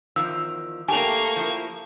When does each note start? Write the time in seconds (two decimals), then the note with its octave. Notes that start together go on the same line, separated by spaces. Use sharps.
0.16 E2 D#3 F3 E6
0.88 A3 A#3 G4 G#5 A5 C#6 F7
1.36 F3 E4